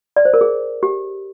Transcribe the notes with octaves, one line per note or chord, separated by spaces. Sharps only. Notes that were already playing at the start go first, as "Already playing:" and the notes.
D5
C5
A#4
G#4
G4